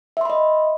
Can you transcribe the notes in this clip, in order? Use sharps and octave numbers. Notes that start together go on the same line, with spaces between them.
D#5 E5 B5 C6